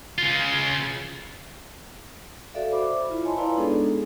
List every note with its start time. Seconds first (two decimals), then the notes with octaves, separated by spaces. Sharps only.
0.18 C#3 F4
2.55 F#4 A4 D5 E5 F5
2.72 C5 E5 B5 D6
3.09 E4 F4
3.24 C#5 D#5 G#5 A5 B5 C6
3.37 E4 B4 D5 F5 A#5
3.57 G#3 B3 D4 D#4 G#4 A4